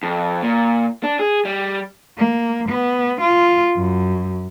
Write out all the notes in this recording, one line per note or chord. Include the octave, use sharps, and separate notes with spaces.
F2
A#2
D4
G#4
G3
A#3
B3
F4
F#2